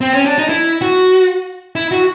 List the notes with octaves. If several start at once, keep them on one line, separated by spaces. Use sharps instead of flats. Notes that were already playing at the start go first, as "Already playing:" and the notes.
C4
C#4
D4
D#4
E4
F#4
E4
F#4